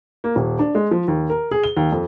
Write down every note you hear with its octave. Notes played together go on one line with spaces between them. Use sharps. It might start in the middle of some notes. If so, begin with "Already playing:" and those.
A#3
D#1
D4
G#3
F3
D#2
A#4
G#4
G7
D#2
F2